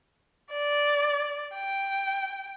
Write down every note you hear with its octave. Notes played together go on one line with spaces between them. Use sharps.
D5
G5